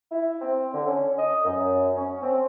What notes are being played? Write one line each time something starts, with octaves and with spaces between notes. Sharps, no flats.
E4
C4
D3
C#4
D#5
F#2
C#4
C4